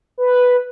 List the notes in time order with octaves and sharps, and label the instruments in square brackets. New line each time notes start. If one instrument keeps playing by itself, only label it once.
[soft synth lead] B4